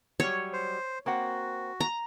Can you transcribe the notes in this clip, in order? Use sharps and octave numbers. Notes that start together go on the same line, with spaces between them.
F#3 G3 C#5
C5
A#3 C4 F#4 F#5
A#5